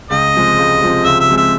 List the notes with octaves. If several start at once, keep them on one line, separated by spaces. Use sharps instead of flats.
C#2 D#5
C3 F3 G#3
C#2
C3 F3 G#3
C#2 E5
E5
C3 F3 G#3
E5